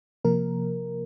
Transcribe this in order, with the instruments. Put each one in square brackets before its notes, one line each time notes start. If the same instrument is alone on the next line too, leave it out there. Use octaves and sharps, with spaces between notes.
[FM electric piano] C3 F3 A#3 A#4